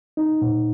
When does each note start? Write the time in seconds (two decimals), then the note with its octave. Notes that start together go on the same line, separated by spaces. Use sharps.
0.17 D#4
0.42 A#2